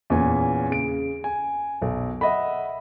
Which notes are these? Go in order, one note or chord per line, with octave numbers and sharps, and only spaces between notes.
E2 A#2 C#4 G#5
C#3 D7
G#5
B1
D#5 E5 F#5 B5